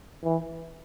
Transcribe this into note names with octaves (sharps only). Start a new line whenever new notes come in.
E3